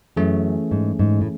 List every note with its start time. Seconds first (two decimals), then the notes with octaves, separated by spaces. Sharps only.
0.16 F#2 E3 A3 C#4 G#4
0.71 G#2
0.99 G#2
1.21 A2